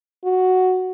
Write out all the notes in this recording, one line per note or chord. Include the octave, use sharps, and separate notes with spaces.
F#4